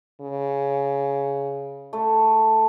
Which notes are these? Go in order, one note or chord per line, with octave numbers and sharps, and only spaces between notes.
C#3
A3